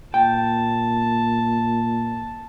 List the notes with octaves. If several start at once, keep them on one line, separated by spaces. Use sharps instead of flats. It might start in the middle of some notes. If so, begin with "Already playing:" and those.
A#2 G5 A5